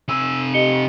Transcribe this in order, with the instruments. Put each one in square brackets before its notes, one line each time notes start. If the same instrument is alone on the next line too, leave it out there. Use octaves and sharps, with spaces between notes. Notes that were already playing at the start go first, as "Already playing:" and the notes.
[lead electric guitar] C3 G#5 [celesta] E6
[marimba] G4 D#5 [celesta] C#7 G7